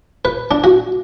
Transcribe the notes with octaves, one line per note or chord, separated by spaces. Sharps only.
B4
D4
F#4